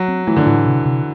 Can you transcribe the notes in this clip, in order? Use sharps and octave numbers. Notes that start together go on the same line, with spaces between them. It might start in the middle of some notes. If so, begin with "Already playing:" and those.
Already playing: F#3
C4
E3 A3
D3
A2 E3
C3
C3